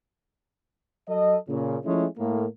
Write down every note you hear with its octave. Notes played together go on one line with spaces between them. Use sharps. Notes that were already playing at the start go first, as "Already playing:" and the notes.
F#3 A4 D#5
A#2 C#3
F3 G#3 A3 C#4 E4
A2 A#3